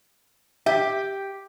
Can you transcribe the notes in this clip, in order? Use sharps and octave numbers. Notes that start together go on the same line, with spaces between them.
G4 E5